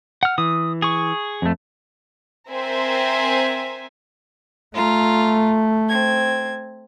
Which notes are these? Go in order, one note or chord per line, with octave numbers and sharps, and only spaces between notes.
F#5 F6
E3 D#6
G#4 C#6
F2 A3
C4 A#4 C5 E5 G#5
A3 F4 A#5
C4 G#6